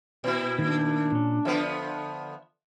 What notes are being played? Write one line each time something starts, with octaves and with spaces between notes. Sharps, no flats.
A#2 E4
D#3 A#3 D4
A#2 C#4
D3 F3 B3 E5